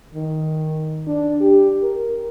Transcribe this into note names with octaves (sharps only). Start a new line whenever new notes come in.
D#3
D4
G4
A#4